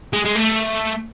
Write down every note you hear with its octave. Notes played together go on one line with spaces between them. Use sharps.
G#3
G#3
A3